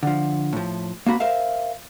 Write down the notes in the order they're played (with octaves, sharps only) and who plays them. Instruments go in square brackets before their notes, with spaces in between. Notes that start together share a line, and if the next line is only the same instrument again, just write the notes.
[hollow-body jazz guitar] D3 F3
A2 F3
A#3 C4 F#4 B5
A#4 C5 E5 F5